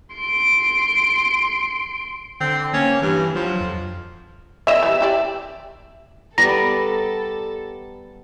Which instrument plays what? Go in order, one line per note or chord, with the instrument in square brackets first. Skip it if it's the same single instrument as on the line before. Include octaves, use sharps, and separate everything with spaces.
[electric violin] C6 D7
[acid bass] D3 [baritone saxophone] C4
[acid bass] A#3 [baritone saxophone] C#4
[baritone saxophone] G2 [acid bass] E3
[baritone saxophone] F3 [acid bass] F#3
[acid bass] F2
[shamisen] E4 D#5 [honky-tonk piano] E5 E7
[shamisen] E3 G3
E4 G4 D5
[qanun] G3 B3 D5 [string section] A4 [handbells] A#5 [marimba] A#6